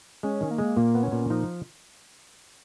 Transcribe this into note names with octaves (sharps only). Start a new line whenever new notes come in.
G#3 C#4
D#3
A#3
G#3
A#2 A#3
B3
C#4
A#2
F3 D#4